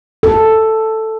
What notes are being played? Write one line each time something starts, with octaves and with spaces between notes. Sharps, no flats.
A4